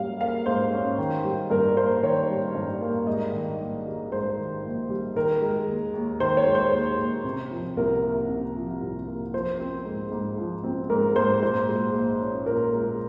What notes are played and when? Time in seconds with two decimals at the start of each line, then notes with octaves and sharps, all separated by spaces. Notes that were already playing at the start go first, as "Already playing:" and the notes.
Already playing: G#2 G3 A#3 C#4 F5
0.20 A#3 F5
0.46 G#2 C5
0.72 C#4
0.98 D#3
1.24 G3
1.50 G2 A#4
1.77 A#3 C5
2.03 D#3 C#5
2.29 G3
2.55 G2
2.81 A#3
3.07 G#2 D#5
3.33 D#3
3.59 A#1
3.86 G3
4.11 G#2 C5
4.37 D#3
4.64 A#1
4.90 G3
5.16 D#3 A#4
5.41 G#3
5.68 D#2
5.94 D#2
6.20 D#3 C5
6.37 C#5
6.46 G#3
6.55 C5
6.72 D#2
6.99 D#2
7.24 C3
7.51 F3
7.77 C2 A#4
8.03 A#3
8.28 C3
8.56 F3
8.82 C2
9.07 A#3
9.33 F3 C5
9.60 C4
9.85 G#2
10.12 G#2
10.38 F3
10.64 C4
10.90 G#2 A#4
11.16 G#2 C5
11.42 A#2 C5
11.69 G#3
11.94 A#1
12.21 C#4
12.46 A#2 A#4
12.73 G#3